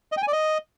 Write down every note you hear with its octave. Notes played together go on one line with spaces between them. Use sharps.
D#5
G5
G#5
D5
D#5